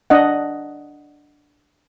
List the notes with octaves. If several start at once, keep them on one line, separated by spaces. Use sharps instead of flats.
D4 D#5 F#5